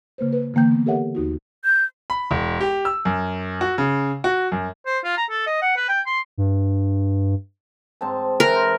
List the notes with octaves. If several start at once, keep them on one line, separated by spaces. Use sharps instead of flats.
C#3 A#3 B4 C5
B4
D3 E3 A#3 G5 G6
B3
G4 A4 A#4 C#5 E5 F#5
D#2 D#4 F#4
G6
B5
E1
G4
E6
F#2
F#4
C#3
F#4
F#2
C5
F4
A#5
A4
D#5
F#5
B4
G5
C6
G2
G#2 C4 A5
E3 E4 A#4
C5